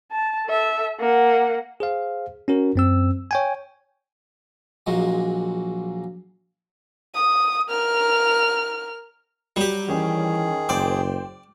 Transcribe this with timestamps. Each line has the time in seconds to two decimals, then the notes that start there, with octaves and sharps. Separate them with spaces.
0.11 A5
0.46 A4 E5
1.00 A#3 F#5
1.80 G#4 C5 F5
2.48 C#4 F#4 A#4
2.76 F#2 C4 E6
3.31 C#5 G5 G#5
4.87 A#1 A#2 F#3 G#3
7.15 D#6
7.69 A#4 F6
9.56 F#3 G3 G4
9.88 D#3 E3 C#4 G#4 G5
10.69 F#1 C5 D5 G5 D6